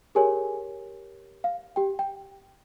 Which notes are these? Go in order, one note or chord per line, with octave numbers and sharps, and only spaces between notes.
G4 G#4 A#4 C#5 G#5
F5
G4 G5
G5